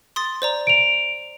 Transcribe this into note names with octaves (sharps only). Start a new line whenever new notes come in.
C6 D#6 A6
C5 D5 A#5
D7 F7